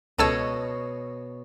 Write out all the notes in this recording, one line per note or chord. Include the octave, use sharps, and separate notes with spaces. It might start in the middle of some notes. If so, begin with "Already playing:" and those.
C#2 B2 A4 C#5 D#5 E6